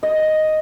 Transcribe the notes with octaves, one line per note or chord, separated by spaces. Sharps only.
D#5